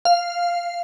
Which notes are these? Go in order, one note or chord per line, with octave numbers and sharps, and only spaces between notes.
F5